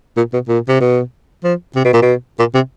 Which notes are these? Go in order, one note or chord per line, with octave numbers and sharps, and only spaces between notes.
A#2
B2
A#2
C3
B2
F3
C3
B2
A#2
B2
A#2
C3